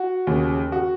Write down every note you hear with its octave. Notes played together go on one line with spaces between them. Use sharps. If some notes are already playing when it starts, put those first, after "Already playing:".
Already playing: F#4
D#2 C#3
F#4